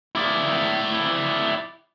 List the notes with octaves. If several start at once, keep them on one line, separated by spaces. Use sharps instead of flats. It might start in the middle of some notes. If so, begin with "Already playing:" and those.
E4 D5